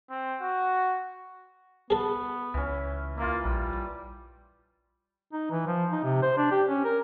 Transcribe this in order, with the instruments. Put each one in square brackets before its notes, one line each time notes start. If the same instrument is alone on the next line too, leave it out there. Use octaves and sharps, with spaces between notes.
[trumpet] C4
F#4
[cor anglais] B3 [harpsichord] G#4 A4
[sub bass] C#2 [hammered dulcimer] E3 C#4
[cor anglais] A#3 [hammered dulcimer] E4 F4
[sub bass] A#1 [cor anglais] G3
[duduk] D#4
E3
F3
D#4
C3
C5
D4
G4
C#4
A#4